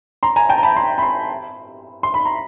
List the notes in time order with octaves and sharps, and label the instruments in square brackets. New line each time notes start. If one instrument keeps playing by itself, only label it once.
[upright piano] A#5 C6
G#5 A#5
G5 A5
A#5
A5 B5
A#5 C6
B5
A#5 C6
C6
B5
A#5